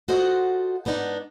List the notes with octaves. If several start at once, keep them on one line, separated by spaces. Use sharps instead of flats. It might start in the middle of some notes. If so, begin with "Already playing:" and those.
F4 F#4 A4 C5 D#5 F#5
G#2 B3 D4 D#4 F#5